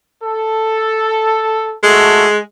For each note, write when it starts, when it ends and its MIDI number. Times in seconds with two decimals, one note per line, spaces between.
0.21 1.75 69
1.83 2.38 56
1.83 2.27 57
1.83 2.27 66
1.83 2.27 69